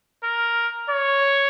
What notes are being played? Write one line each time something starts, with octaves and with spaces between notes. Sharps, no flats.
A#4
C#5